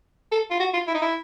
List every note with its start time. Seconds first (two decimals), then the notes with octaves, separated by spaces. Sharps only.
0.32 A4
0.51 F4
0.60 F#4
0.74 F4
0.87 E4
0.94 D#4
1.02 E4